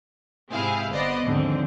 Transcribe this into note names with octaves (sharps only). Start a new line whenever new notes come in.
G#2 C3 C4 E4 G#4 F5
G1 B3 C5 D5 D#5
D#2 G#2 D3 F3 C4